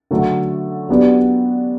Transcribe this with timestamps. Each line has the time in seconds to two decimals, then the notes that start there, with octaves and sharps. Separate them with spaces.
0.11 D3 F#3 A3
0.89 F#3 B3 D4 G4 D5